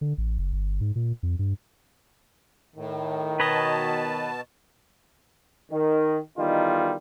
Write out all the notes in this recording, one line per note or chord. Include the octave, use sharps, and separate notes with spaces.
D3
A1
F#1
G1
G#2
A#2
F2
G2
A2 D#3
B2 B4 C#5 D#5 A5
D#3
E2 D#3 G3 D#4 F4